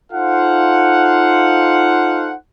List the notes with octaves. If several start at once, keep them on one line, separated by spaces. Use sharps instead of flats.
D#4 F4 A4 C5 F5 F#5